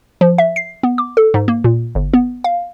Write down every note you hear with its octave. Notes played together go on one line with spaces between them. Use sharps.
F3
E5
C7
B3
D6
A4
G#2
A#3
A#2
G1
B3
F5